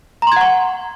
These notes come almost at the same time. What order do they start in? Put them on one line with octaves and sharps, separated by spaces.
A#5 C6 G#6 F#5 C#6